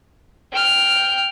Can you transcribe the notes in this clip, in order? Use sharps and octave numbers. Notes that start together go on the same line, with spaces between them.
G5 F6